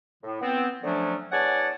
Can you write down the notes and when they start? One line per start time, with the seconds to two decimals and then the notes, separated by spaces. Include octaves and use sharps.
0.24 A2
0.42 B3 C4
0.84 D3 F3 F#3 A3 C#4 D4
1.32 E2 C#5 D5 F#5 G#5 A5